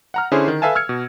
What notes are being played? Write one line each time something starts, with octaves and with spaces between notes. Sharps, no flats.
F#5 A#5 F6
D3 C#4 E4 G#4 C5
D#3
A4 B4 E5 F5 G#5 A5
E6 F6 G#6 C#7
B2